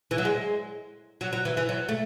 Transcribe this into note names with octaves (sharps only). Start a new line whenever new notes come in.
E3
F#3
G#3
F#3
F#3
E3
E3
F#3
A3